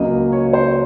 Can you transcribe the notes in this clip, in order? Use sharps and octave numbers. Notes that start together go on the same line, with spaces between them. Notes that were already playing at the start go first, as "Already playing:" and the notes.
Already playing: C#2 C#3 F#3 A#3 D#5
C#5
C5